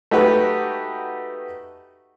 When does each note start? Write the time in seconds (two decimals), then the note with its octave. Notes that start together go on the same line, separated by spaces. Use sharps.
0.11 A3 D#4 F#4 G4 B4